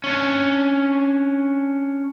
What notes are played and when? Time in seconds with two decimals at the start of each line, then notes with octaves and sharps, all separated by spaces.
0.04 C#4 D4